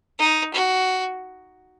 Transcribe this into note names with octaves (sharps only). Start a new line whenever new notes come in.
D#4
F#4